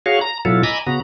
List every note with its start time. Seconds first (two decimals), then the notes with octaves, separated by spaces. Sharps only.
0.06 F#4 G#4 C#5 F5
0.21 A#5
0.45 B2 F#3 E4 F4 A4
0.63 D#5 G#5 A#5 B5 D6 E6
0.86 C#3 B3 F#4 A#5